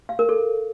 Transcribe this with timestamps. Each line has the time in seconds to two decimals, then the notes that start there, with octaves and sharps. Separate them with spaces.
0.09 F5
0.19 A#4
0.29 A4